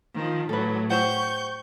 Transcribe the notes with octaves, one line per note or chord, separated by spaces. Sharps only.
D#3 F3
A2 F#3 A4 B4
G4 C5 F#5 C#6 G6